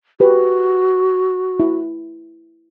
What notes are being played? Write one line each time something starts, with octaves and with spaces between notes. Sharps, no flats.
F#4 G4 B4
E4